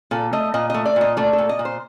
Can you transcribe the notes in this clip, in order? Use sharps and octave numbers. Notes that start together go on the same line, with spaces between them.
A#2 A4
A3 D#5
A#2 D#5
A3 D#5
D5
A#2 D#5
A3 D5
A4
A#2
D#5
A#2
C5